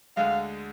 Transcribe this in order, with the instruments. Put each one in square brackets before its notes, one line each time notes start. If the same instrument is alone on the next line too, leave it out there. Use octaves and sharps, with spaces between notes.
[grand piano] D2 D3 G#3 [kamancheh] F5